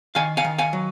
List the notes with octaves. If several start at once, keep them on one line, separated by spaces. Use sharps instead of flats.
D#3 F5 G#5
F5 G#5
D#3
F5 G#5
F#3